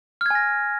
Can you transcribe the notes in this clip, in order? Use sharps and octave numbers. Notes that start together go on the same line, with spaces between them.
G#5 F6 G#6 A#6